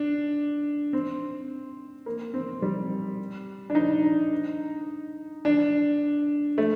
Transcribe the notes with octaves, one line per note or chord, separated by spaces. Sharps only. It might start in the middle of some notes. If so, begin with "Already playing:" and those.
Already playing: D4
C4
A#3
C4
G3
D4
D#4
D4
A3